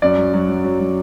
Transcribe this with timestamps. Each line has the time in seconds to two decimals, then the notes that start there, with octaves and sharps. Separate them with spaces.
0.02 F#2 D5
0.18 F#3
0.34 F#3
0.49 F#3
0.64 F#3
0.79 F#3